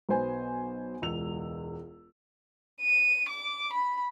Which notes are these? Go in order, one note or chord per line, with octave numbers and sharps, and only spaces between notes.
B1 B2 B3 C5 G#5
E1 C#2 E6 F7
D#7
D6
B5